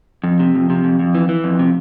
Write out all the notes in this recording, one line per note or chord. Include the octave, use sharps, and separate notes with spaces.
F2
C3
F2
C3
F2
F2
E3
E3
F2
C3